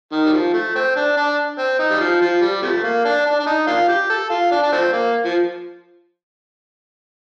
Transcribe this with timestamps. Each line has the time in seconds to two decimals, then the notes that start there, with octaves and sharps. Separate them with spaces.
0.12 D#3
0.25 G3
0.33 F3
0.53 A3
0.75 C4
0.96 D4
1.17 D4
1.59 C4
1.79 D#4
1.90 G3
2.00 F3
2.21 F3
2.42 G3
2.62 C3 F3 A3
2.84 A#3
3.05 D4
3.26 D4
3.39 D4
3.47 D#4
3.67 A#3 D4 F4
3.88 G4
4.09 A4
4.30 F4
4.51 D4
4.63 D4
4.72 F3 A3 C4
4.93 A#3
5.25 F3